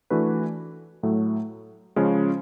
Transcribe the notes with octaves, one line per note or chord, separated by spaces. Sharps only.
E3 A3 D4 F#4 B4
A2 F#3 A3
C#3 F3 G#3 C#4